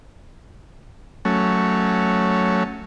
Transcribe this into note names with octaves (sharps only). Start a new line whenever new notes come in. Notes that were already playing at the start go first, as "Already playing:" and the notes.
F#3 A3 C#4